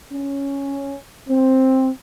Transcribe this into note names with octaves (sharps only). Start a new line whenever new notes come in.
C#4
C4